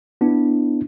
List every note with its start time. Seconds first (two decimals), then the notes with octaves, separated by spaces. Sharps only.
0.21 B3 D4 E4